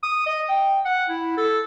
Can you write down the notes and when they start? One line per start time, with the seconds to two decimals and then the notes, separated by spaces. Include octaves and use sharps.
0.03 D#6
0.26 D#5
0.49 G5
0.85 F#5
1.09 E4
1.37 A4